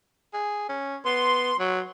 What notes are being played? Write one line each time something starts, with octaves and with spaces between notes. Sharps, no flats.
G#4
C#4
B3 C6
F#3